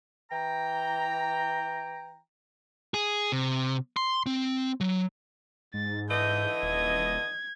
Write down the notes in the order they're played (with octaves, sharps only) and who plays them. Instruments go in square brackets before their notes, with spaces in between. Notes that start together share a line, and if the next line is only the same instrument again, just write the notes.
[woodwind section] E3 G5 A#5
[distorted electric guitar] G#4
C3
C6
C4
F#3
[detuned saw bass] G#2 [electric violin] A6
[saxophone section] D3 E3 D#5 [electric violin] G6
[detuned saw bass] D#1 [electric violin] G#6